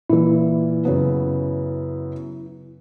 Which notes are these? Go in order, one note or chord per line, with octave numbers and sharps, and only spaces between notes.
A#2 E3 E4
F#2 C#3 B3